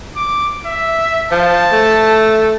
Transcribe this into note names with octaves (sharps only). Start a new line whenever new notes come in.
D6
E5
F3 A5
A3